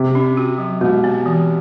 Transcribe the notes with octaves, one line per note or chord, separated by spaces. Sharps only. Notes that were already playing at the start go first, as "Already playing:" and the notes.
Already playing: C3
C#4
F#4
F#3
B2 G#3
B3
E3